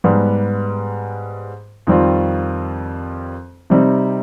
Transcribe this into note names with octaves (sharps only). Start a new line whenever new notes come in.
G#2 G3 B3
F2 D#3 G3 C4 F4
C3 G3 C4 D#4